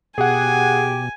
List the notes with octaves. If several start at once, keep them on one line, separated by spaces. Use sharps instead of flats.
B2 G4 G#4 F#5 G#5